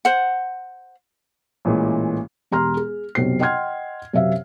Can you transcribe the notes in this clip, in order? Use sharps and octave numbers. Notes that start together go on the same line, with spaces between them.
C5 F#5
A1 A#2 E3 G#3
E1 G4 A#5 C6 F6
G#4
B1 F#2 C3 C4 C7
D#5 F#5 G5 C6 F6 G#6
F#2 C3 E5 F5